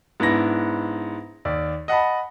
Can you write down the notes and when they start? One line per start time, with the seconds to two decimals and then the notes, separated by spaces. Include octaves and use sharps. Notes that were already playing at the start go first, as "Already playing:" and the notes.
0.20 G#2 B3 D4 E4 A#6
1.45 D#2 D5
1.88 D#5 F#5 A5 B5